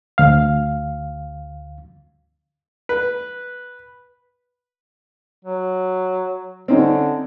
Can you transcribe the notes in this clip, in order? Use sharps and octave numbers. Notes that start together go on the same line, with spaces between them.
D2 F5
B4
F#3
D3 C4 C#4 D#4